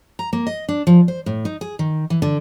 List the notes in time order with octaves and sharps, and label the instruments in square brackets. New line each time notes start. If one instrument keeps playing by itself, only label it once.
[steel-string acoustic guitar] A#5
A#3
D#5
D4
F3
C5
A2
D#4
G#4
D#3
E3
D3